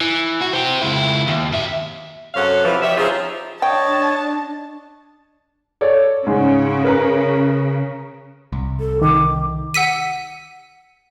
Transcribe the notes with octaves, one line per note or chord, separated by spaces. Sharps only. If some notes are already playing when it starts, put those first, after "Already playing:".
E3
F#4
G4 C5
C#2 E4
D#2
B2 E5
F#2 C3 C#4 A4 F5 F#5
C3 E3 F3
G4 C#5 D5 E5
F3 C4 C#4 D#4 F4 G#4
D4 C#5 D#5 G5 A5
A4 C#5 D5
G#2 C#3
A#4 B4 A#5
C2
A4
D#3 D6
F#5 E6 B6 D#7